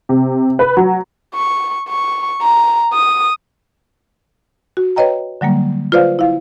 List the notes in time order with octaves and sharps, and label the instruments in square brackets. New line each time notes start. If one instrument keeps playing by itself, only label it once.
[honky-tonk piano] C3
B4
F#3
[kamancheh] C#6
C#6
A#5
D#6
[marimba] F#4
B4 C#5 D#5 G5 A#5
D3 F#3 G3 A#3
F4 B4 C5 D5 F5
E4 F5